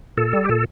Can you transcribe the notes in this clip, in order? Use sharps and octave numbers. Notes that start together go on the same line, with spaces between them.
A#2 A4
G3
G4
A#2 A4